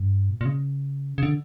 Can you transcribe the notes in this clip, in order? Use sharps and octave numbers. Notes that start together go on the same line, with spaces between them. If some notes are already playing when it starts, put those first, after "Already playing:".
Already playing: G2
A#2
A#2
C#3
C#3
D3